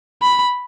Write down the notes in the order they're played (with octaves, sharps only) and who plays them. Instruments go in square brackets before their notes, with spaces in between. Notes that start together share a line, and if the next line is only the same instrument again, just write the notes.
[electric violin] B5